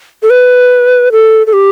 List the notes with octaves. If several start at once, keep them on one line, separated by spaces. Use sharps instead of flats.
A4
B4
A4
A4
G4